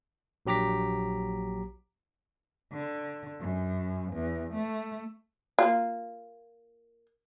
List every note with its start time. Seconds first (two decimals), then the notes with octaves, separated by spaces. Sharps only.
0.46 A#1 F#3 G4 A#5 D6 B6
2.72 D3
3.40 F#2
4.13 E2
4.54 A3
5.59 A#3 F4